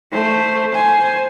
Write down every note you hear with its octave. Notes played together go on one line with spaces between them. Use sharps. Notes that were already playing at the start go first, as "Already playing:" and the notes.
A3 C5
C5 G#5